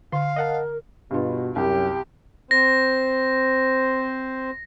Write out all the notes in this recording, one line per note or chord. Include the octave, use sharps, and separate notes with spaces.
D3 F5 C6
A#4 D#5 F#5 A5
G2 B2 F4
C2 F#2 G4
C4 C5 A#6